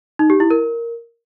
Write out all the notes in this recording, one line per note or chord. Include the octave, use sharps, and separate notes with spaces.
D#4
G4
E4
A#4